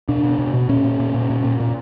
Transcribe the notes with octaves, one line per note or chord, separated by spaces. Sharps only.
B2 D4
B2
B2
B2
A#2 C#4
A#2
A#2
A#2
A#2
A#2
A#2